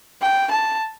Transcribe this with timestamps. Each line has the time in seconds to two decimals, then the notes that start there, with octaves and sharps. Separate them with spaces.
0.22 G5
0.51 A5